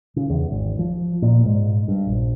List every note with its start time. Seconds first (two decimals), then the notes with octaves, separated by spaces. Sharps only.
0.16 C#3
0.30 E2
0.51 G#1
0.79 F3
1.22 A#2
1.46 G#2
1.88 G2
2.07 A#1